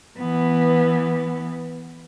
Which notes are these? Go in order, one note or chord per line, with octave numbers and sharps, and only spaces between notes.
E3 B3